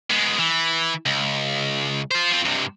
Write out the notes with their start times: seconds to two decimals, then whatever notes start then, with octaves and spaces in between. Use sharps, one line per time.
0.10 G#3 B3
0.39 E3
1.06 C#2
2.11 F4 C5
2.32 C4 F4
2.45 G2 C3